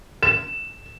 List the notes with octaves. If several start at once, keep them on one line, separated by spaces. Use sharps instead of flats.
E7